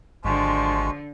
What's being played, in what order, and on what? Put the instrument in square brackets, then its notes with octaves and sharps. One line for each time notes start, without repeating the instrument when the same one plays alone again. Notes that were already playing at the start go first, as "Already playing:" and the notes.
[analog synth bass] G#1 [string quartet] D3 [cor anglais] F3 [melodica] G#3 F#4